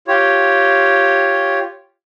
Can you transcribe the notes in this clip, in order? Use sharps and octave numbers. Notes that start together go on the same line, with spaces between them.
F4 G4 C#5